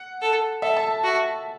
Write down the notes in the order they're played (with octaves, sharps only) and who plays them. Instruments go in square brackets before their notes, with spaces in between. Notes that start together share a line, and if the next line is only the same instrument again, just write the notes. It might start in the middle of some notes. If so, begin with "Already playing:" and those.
Already playing: [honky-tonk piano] F#5
[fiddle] A4
[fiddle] A4 [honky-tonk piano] E5
[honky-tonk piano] A5
[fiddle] F#4